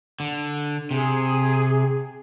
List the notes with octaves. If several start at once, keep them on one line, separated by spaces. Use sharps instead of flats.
D3
C3 G#4